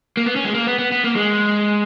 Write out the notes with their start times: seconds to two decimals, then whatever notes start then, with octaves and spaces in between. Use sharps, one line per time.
0.17 A#3
0.26 B3
0.36 C#4
0.45 G#3
0.54 A#3
0.67 B3
0.79 B3
0.92 B3
1.04 A#3
1.16 G#3